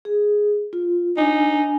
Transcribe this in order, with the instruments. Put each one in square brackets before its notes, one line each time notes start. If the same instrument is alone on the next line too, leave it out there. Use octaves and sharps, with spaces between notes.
[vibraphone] G#4
F4
[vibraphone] D4 G#5 [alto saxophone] D#4